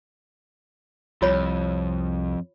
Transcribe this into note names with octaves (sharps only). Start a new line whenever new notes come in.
C2 F2 F4 C#5 B5